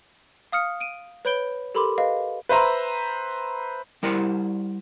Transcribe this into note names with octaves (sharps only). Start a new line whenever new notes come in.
F5 D#6 F6 C#7
D7 D#7
B4 C#5 B5 G6 D7 G7
G4 A4 A#4 B5 C6 D6
B4 D#5 F5
B4 C5 E5 A#5
G3 E4 A#4 C5 F#5